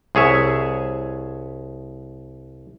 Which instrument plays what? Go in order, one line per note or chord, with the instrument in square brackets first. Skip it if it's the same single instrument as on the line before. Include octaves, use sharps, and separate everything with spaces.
[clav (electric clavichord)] C2 G#4 C#5 E5